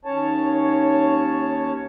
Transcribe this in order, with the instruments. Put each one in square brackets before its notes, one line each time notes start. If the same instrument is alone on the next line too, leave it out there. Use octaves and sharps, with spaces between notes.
[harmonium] D#2 C#4 C#5 A5